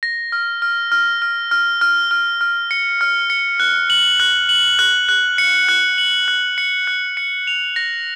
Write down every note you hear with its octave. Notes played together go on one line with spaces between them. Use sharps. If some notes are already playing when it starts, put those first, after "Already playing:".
A#6
F6
F6
F6
F6
F6
F6
F6
F6
C#7
F6
C#7
F#6
F#7
F#6
F#7
F#6
F#6
C#7
F#6
F#7
F#6
C#7
F#6
C#7
F7
A#6